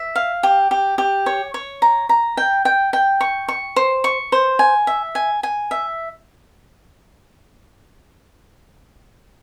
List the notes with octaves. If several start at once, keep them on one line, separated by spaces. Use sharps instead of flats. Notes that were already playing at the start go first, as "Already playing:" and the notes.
Already playing: E5
F5
G4
G4
G4
C#5
C#5
A#5
A#5
G5
G5
G5
C#6
C#6
C5
C#6
C5
G#5
E5
G#5
G#5
E5